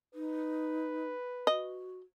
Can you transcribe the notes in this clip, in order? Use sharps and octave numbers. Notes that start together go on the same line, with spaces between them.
D#4 B4
F#4 D#5